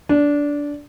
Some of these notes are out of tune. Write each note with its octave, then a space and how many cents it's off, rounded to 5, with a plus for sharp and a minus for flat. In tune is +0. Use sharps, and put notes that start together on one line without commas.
D4 -15